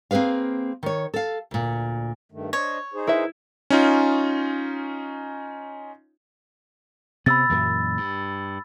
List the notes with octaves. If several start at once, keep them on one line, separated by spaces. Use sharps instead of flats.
A#3 C4 G#4 B4 F5
D#3 C#5
A4 F5
D2 A#2
G2 D#3 A3
D4 C5 C#5 D#5
D#4 G#4 C5
E4 A#4 B4 E5
C#4 D#4 F4
C3 B3 B5 E6 A6
F#2 A#2 E3
G2